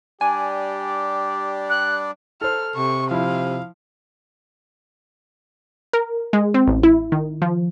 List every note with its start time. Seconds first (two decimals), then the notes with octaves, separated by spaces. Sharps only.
0.21 G3 D4 G4 D5 G#5
1.70 F#6
2.41 A4 C5 F6
2.76 C3 C#6
3.11 F3 E4 F5
5.93 A#4
6.33 G#3
6.54 C4
6.67 A1
6.83 E4
7.12 D#3
7.42 F3